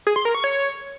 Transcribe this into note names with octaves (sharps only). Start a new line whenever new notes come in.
G#4
C6
A#4
C#6
C#5